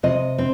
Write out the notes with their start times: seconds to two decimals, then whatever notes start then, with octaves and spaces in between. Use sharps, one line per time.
0.03 C3 D#5
0.38 C4